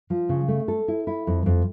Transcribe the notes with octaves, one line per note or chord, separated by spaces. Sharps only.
F3
C#3
A3
A4
E4
E4
F2
F2